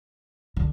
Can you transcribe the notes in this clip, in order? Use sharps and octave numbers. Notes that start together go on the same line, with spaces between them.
D3